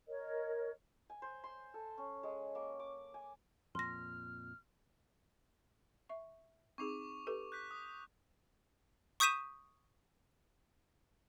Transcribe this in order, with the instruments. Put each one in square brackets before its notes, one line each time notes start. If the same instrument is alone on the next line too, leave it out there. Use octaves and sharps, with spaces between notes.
[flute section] A#4 C#5 D#5
[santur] G#5
C5
C6
A4
C#4
G#3
A#3
D6
G#5
[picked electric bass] F2 A#2 [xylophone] C6 A#6 [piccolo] F6
[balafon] E5 C#6
[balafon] C4 D#4 G#4 [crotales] C#6 D6 F7
[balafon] G4 A4 B4
[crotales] F#6 G6 B6
D#6
[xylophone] C#6 D#6 G6 B6 D#7 E7